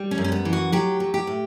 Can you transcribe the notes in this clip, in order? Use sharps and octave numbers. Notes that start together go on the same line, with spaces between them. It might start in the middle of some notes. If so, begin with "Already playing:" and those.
Already playing: G3
C#4
F#2
C#4
B3
E3
F#4
F#3 G4
F#3
G4
A2